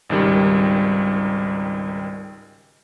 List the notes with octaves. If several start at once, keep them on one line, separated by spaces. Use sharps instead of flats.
G#1 C#2 D#3 G3